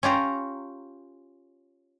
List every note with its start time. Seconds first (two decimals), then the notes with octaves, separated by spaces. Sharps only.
0.03 C#4 F4 G4 A#5